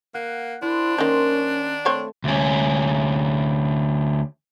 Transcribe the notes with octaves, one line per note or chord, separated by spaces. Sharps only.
A#3 F#5
D4 E4 C5
D#3 A#3 C#4 D#4 C6
A3 C4 C#5 F5
D2 C#4